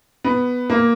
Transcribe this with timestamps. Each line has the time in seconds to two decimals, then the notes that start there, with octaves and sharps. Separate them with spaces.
0.24 B3
0.70 A#3